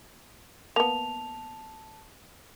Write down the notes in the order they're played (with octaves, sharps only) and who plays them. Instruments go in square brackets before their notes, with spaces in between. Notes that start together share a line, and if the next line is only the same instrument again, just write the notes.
[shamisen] A#3 B3 [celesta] A5 F7